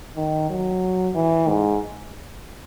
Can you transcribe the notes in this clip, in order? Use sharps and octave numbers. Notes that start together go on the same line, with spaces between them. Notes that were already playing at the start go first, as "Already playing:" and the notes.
D#3
F#3
E3
G#2